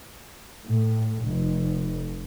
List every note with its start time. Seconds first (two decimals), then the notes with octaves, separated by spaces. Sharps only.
0.64 A2
1.23 F1